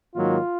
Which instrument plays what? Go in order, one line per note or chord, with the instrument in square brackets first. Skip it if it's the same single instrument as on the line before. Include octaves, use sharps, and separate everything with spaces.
[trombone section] G#2 D#3 F#3 A#3 F4